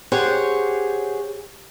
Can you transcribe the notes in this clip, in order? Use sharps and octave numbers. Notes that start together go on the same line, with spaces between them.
G4 G#4 C5 C#5 F#5